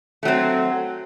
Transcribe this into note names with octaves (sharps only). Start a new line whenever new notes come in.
F#3 A3 C4